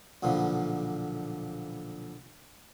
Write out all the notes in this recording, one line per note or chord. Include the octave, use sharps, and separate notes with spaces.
B1 A#2 D3 F3 B3